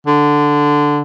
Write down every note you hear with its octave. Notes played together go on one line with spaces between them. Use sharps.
D3